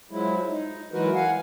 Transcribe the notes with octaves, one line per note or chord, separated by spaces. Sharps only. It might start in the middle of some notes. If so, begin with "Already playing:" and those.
F3 F#3 G#3 E4
D#4
E3 F#3 G#3 F#4 A#4 B4
F5 F#5 G#5